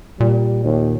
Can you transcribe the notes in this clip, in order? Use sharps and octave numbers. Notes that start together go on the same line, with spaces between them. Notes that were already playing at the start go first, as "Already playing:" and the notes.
A#2 G3
D#2